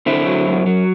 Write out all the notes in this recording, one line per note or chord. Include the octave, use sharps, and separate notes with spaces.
D3 C4 E4
F#3
F#2
F#3